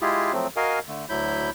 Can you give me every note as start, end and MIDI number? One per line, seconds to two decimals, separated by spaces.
0.02 0.32 56
0.02 0.32 64
0.02 0.32 65
0.02 0.32 67
0.02 0.32 68
0.33 0.47 53
0.33 0.47 54
0.33 0.47 57
0.33 0.47 60
0.56 0.79 66
0.56 0.79 70
0.56 0.79 75
0.56 0.79 77
0.56 0.79 80
0.88 1.05 50
0.88 1.05 57
1.09 1.50 38
1.09 1.50 54
1.09 1.50 64
1.09 1.50 83
1.09 1.50 91